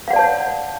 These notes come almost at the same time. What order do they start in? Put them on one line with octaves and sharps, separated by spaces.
F5 F#5 D5 A5 C#5